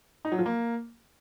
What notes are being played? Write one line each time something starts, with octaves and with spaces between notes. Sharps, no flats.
D#4
F#3
F3
A#3